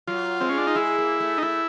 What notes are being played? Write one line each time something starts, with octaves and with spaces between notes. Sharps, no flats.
F#3 F4
G#3 C4
C#4
D4
D#4
G#3 E4
A#3
A3
D#4
A3 E4